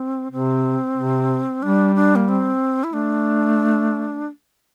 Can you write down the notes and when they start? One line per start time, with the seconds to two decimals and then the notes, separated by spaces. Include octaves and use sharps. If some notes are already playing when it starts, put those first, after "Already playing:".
Already playing: C4
0.31 C3 C4
0.97 C3
1.62 G3 D4
1.95 D4
2.16 A#3
2.28 C4
2.84 E4
2.93 A3 D4